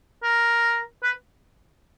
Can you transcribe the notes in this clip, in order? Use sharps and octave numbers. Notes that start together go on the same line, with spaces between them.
A#4
B4